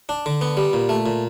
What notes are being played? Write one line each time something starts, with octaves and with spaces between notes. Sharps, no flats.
D4
D3
B3
G3
A#2
A3
A#2